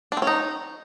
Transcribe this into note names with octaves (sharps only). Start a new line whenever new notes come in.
D4
C4
C#4
D#4